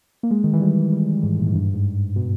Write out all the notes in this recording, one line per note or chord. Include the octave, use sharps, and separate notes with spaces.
A#3
G#3
D#3
E3
G3
G3
G#2
A#2
G#2
G2
G#2
B2